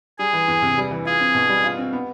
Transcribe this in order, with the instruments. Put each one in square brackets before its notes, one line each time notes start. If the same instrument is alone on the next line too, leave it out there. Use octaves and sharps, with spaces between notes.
[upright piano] G3 [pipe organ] G#4
[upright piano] E3
E2
C3
G3
E3
[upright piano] F4 [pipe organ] G#4
[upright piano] C4
B2
G3
F4
C4
B3